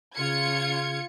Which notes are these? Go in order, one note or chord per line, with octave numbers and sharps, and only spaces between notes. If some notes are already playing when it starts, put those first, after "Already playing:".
C#3 F4 G#6 C#7